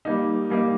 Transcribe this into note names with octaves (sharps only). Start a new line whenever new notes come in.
G3 A#3 D#4
G3 A#3 D#4